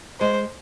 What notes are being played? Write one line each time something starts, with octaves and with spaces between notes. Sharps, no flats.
G#3 C5